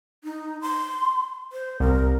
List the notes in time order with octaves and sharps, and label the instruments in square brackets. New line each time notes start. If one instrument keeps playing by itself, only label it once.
[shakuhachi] D#4
C6
C5
[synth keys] C2 [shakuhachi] A#4